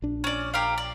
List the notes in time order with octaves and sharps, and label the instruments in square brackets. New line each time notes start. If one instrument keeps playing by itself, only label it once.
[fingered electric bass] A#1 D4
[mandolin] C#4 D5
G4 A#4 F5
D5